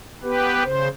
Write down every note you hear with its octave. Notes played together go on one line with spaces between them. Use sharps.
B3 G4 B4
C#3 C5